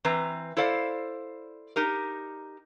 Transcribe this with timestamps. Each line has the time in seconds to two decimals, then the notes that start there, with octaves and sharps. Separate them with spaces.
0.05 E3 C4 B4 A#5
0.57 E4 A4 C5 D5 F5
1.76 D#4 G4 A#4